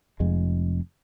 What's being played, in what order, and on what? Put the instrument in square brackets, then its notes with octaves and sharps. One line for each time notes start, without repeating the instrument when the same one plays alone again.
[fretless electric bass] F1 F2 G#3